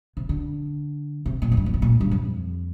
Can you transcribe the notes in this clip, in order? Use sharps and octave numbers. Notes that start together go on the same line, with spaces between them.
C3
D3
C3
A#2
F2
G2
F2
A2
A#2
G2
F2